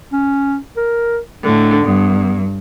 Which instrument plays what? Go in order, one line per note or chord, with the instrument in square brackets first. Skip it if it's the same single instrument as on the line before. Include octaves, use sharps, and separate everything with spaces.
[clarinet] C#4
A#4
[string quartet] A2 D3 [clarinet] D4
[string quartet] G2 [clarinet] B3